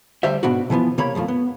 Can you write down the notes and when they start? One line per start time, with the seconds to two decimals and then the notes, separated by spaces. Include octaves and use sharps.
0.23 D2 G3 C5 E5
0.43 G#2 B2 B3 D4 F#4
0.70 B2 E3 F3 B3
0.98 C3 A#3 C#5 B5
1.15 B1 F#2 F3 A3
1.28 B3